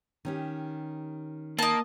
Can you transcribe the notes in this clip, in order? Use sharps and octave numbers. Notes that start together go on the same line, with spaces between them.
D#3 C#4 G4
A#3 D#5 A5